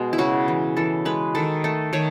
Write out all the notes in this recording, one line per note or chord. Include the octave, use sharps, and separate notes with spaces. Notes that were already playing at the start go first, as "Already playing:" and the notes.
Already playing: B2 G#3
E4
C#3 F#4
E3
E3 A4
G#3 B4
D#3 A4
A3 A4
D#3 C#5